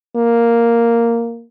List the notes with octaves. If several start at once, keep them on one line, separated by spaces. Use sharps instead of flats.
A#3